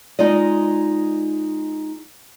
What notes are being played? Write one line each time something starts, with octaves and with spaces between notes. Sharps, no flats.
G#3 D#4 F4 D5 D#5